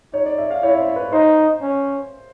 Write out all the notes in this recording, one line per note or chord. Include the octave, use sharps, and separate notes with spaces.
D#4 C#5
D5
E5
F5
E4 C#5
C5
B4
D#4 C5
C#4